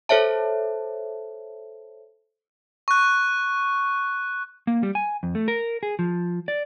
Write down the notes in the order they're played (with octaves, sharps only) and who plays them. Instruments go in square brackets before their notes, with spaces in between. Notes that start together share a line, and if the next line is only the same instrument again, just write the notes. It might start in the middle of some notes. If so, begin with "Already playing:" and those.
[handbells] A4 C5 C#5 E5 A5
[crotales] C#6 F#6
[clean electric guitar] A#3
G3
G#5
F2
A3
A#4
G#4
F3
D5